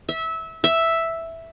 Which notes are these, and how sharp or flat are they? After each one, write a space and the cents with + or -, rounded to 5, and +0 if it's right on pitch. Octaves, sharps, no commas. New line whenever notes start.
E5 -20
E5 +0